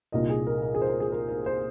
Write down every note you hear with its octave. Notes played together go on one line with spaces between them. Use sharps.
C2 A#2 A#3 D#4 D#5
G#4
A#4
A#4
G#4
C5
A#4
G#4
A#4
A#4
C5